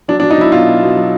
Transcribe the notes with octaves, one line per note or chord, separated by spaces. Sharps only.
F#3 D4
D4
F#3
D#4
F#3 E4
B2 F4
B2
B2
F#3